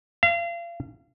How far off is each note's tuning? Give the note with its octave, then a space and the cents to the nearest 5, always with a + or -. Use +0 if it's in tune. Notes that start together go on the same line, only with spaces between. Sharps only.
F5 -35